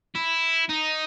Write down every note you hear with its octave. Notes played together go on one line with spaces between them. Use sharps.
E4
D#4